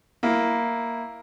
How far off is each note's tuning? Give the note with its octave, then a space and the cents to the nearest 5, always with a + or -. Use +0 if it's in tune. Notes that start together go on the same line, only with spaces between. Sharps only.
A#3 +0 E4 +0